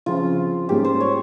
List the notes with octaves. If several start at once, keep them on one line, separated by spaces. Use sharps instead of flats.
C#3 F3 C4 F4
G#2 G3 A#3 C#4 G4 G#4
C5
C#5